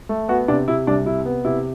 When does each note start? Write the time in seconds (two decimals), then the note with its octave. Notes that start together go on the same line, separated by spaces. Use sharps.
0.09 A3
0.28 B3 F#4
0.48 C3 D4
0.68 C3 E4
0.87 C2 D4
1.06 C3 E4
1.25 B3
1.45 C3 E4